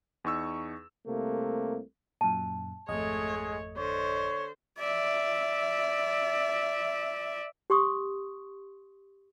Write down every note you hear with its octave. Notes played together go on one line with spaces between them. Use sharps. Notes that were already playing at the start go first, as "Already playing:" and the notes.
E2 D#4 C#6 E6
C2 C3 A3 A#3
F#2 A#2 A5
G#1 F2 G#3 A3 C#5 D#5
D3 C5 C#5
D5 E5
G4 C6 C#6 D#6